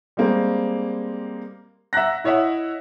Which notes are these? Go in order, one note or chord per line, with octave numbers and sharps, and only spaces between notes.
G3 G#3 A#3 C4
E5 F#5 A#5 F#6 A#6
E4 C#5 D#5 E5 F#5